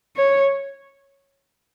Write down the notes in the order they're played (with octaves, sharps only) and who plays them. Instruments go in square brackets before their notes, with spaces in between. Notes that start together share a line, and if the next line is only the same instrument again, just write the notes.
[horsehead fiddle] C#5